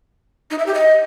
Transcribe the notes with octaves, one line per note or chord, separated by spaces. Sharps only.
D#4
E5
G4
D#5